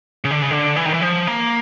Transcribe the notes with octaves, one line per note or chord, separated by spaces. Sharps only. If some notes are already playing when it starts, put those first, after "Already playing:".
C#3
D3
C#3
D3
E3
D#3
E3
F3
A#3